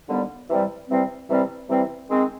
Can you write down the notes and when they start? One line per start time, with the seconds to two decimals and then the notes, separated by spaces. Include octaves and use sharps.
0.09 D#2 D3 G3 B3
0.49 C3 E3 G3 C4
0.90 C3 E3 G3 C4
1.30 C3 E3 G3 C4
1.70 C3 E3 G3 C4
2.10 D#3 G#3 C4